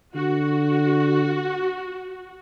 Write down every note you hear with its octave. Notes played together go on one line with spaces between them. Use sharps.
D3 F#4